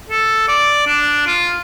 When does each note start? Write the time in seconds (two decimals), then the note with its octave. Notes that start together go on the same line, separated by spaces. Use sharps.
0.09 A4
0.48 D5
0.87 D4
1.27 F4